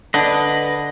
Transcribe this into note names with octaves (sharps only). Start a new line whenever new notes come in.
D3 B4 D#5